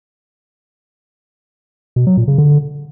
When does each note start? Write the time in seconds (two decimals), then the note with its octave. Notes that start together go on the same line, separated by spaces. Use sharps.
1.96 B2
2.07 F#3
2.17 A#2
2.28 C#3
2.38 D3